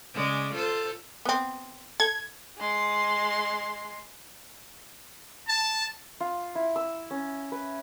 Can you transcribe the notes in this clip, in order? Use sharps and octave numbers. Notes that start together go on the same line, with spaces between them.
C#3 G#3 D5
F4 A4 C5
B3 C4
A4 G#6
G#3 C6
A5
F4
E4
E6
C#4
B4